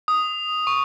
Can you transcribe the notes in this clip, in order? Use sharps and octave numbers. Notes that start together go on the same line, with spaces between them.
D#6
C#6